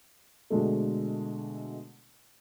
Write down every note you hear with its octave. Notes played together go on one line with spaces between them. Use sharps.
B2 D3 G#3 A3